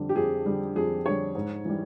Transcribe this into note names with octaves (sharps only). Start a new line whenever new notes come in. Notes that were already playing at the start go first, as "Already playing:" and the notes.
Already playing: F2 D3 G3
G4
F2 G#4
D3 G3
F2 G#4
D3 G3 C#5
G#2
E3 G3